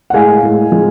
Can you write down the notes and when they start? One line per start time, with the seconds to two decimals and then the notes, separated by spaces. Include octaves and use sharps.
0.10 F#5
0.14 A2 G#3 F5 G#5
0.43 A2 G#3
0.72 F3 G#3